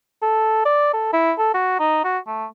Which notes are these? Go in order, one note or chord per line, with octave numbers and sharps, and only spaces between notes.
A4
D5
A4
E4
A4
F#4
D#4
F#4
A3